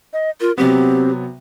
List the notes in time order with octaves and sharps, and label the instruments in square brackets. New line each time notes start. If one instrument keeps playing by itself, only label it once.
[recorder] D#5
[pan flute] F4 [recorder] A#4
[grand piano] C3 F#3 B3 [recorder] C4 [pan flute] G4